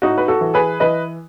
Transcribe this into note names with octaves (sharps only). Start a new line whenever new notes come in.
A2 D#4 F#4
B4
F#4 A4
E3
G#4 B4
E3 B4 D#5